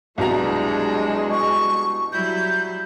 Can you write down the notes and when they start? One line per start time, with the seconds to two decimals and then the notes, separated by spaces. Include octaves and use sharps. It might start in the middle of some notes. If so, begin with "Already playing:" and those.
0.18 C2 B2 F#3 G#3 D4 F#4 A#5
1.31 C#6
2.13 F#3 G3 E4 G6